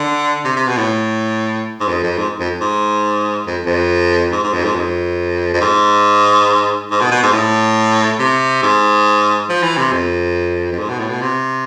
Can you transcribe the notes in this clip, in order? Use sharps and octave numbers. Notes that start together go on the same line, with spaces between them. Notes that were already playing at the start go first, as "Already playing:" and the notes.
Already playing: D3
C3
C3
B2
A2
G#2
F2
F2
G#2
F2
G#2
F2
F2
G#2
G#2
F2
G#2
F2
F2
G#2
G#2
B2
B2
G#2
A2
C3
G#2
F3
E3
C3
F2
F2
G#2
B2
A2
B2
C3